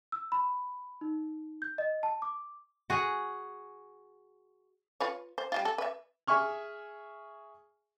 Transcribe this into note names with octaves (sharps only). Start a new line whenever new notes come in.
E6
B5
D#4
G6
D#5
A5
D6
F#4 G#4
F4 B4 C#5
C5
G3 G#3 F4
A4
B4 E5
G#4 E5 G#5 C#6 F6